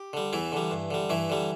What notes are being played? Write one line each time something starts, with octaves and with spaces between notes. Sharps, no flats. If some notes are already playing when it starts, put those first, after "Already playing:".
Already playing: G4
D3 G3
E2 E3 E4
D3 G3
G2
D3 G3
G2 E3 E4
D3 G3